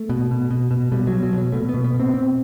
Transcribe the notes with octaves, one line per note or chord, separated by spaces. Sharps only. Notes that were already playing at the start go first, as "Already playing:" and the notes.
Already playing: A3
B2
B2
B2
B2
B2 G3
F#3
B2
F#3
B2 F#3
B2 A3
B3
B2
B3
B2
C4
B2 C4